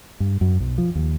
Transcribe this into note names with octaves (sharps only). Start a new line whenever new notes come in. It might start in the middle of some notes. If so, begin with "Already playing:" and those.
G2
F#2
B1
F3
D#2